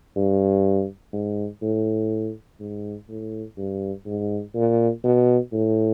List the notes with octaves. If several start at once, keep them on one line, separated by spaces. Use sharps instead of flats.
G2
G#2
A2
G#2
A2
G2
G#2
A#2
B2
A2